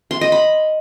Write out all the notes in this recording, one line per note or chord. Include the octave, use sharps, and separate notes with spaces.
C6
D#5
B5